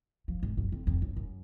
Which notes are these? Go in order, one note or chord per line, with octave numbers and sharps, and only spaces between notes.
F3
G#2
F#2
F2
F2
F#2
F#2